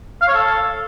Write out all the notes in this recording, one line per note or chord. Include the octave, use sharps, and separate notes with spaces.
F5
C#5
A4